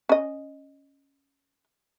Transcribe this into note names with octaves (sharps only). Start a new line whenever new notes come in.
C#4 D#5